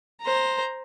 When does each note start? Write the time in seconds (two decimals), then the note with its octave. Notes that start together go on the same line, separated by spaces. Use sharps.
0.21 C5 A#5